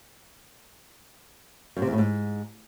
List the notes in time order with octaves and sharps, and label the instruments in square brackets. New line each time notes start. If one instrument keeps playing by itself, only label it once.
[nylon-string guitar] F#2
C3
E2
A2
G#2